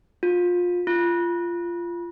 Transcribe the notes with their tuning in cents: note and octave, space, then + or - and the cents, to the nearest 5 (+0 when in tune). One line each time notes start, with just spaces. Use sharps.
F4 +25
F4 -15